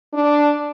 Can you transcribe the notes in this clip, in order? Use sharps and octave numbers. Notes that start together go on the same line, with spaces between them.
D4